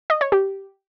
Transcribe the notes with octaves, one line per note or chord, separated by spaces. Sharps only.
D#5
C#5
G4